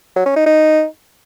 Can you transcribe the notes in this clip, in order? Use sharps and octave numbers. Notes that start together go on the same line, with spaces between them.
F#3
C#4
D#4
D#4